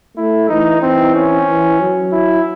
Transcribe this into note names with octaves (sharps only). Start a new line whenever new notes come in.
A3 E4
E3 D#4
E3 C4
C#4
E3
F#3
E4